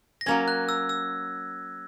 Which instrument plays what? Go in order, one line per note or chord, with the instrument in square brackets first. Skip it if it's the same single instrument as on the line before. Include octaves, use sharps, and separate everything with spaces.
[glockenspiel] A#6
[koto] F#3 A#3 C#4 [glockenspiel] G#6
[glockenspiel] F#6
E6
E6